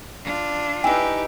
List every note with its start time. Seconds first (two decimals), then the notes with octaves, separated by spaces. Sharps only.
0.24 D4 F4
0.84 D#4 E4 G4 B4 G5 G#5